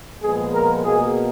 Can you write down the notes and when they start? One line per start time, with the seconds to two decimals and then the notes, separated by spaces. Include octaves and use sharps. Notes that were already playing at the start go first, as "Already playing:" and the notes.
0.22 A#2 F3 G#3 B3 G#4
0.54 A#4
0.84 B2 A#3 G#4